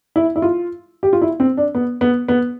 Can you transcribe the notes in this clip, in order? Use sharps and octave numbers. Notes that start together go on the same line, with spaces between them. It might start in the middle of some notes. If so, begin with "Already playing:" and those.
E4
E4
F4
G4
F4
E4
C4
D4
B3
B3
B3